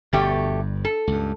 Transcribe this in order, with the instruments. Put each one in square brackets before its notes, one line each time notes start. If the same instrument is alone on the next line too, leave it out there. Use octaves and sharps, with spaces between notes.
[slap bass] G1 G2 [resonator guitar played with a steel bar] B2 A3 G4
[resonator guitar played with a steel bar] A4
[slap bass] C#2 G2